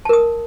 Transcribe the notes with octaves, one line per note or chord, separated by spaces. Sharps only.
A#4 A5 D#6